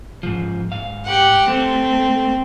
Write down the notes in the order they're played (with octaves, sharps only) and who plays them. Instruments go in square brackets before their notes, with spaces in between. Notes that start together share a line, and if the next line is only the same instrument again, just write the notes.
[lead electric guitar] G#2 F3
G#2 F5
[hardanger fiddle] G4 F#5
[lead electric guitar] A3 [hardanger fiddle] C4